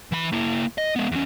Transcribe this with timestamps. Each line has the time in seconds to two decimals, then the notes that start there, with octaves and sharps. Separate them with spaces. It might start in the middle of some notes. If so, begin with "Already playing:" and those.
0.12 E3 B5
0.33 A#3 E4
0.78 D#5
0.96 G#3 B3
1.12 E2 C#4